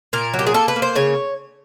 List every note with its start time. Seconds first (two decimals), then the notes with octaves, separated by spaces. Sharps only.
0.13 A#2 A#4
0.34 F#3
0.39 G4
0.47 G#4
0.54 A#3 A4
0.68 B4
0.76 A#3
0.82 C5
0.95 C#3 C#5